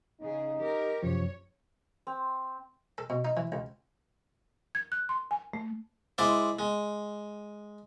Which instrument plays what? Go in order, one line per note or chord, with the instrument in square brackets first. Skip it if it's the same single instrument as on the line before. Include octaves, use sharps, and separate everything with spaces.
[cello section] C#3 G#4 [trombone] D#4
[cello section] G4 A#4
[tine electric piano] F#2 C3 F3 [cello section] C#5
[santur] C4
[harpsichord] A4
B2
D#4
E3
C#2
[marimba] G#6
F#6
C6
G#5
A3
[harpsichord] G#3 E4 C5 D5
G#3